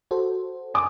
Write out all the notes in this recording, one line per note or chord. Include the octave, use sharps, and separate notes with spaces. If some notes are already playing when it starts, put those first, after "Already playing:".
F#4 A4 C5
G#5 D6 D#6